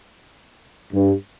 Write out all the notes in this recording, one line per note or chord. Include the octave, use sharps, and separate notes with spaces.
G2